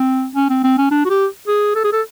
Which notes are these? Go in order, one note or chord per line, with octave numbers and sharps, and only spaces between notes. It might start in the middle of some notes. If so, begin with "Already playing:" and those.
Already playing: C4
C#4
C4
C4
C#4
D4
F#4
G4
G#4
A4
G#4
A4